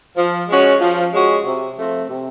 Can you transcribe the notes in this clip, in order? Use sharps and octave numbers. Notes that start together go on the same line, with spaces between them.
F3
G#3 C#4 F#4
F3
G#3 C#4 F#4
C3
F3 A3 C4
C3